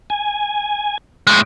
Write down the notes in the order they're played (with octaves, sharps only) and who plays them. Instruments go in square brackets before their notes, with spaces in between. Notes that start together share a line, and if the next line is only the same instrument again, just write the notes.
[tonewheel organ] G#5
[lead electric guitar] A2 G#3